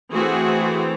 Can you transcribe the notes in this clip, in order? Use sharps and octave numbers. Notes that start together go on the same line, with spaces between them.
E3 A3 C4 F#4 G#4